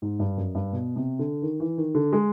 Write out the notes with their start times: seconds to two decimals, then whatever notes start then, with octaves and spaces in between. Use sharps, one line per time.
0.02 G#2
0.19 G2
0.37 F#2
0.55 G2
0.73 B2
0.96 C3
1.19 D3
1.42 D#3
1.60 E3
1.78 D#3
1.95 D3
2.13 G#3